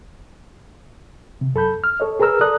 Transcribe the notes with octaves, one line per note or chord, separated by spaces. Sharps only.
C3
F#2 A4 B5 G6
F6
A4 C#5 D#5
G#4 A#4 B4 A#5 E6 F6
A4 D5 A#5 D#6 F#6